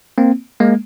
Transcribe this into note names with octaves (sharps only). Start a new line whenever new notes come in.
A#3 C4
G#3 A#3